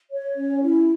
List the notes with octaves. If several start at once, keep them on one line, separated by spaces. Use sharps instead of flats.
C#5
C#4
E4